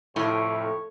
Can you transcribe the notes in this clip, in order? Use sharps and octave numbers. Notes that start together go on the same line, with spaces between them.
F2 A2 C3 E4 C#5